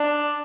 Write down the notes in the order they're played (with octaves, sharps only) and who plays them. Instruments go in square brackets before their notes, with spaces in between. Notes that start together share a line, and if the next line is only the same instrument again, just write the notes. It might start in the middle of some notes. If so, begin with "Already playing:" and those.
Already playing: [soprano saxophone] D4